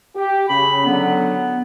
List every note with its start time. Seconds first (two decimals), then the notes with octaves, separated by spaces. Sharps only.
0.15 G4
0.49 C#3 B5
0.85 D3 F#3 B3